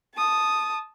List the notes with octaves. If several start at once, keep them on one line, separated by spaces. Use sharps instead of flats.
A5 D#6